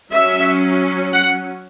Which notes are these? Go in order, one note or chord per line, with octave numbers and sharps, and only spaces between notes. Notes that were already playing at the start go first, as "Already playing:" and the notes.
F#3 C#4 E5
F#5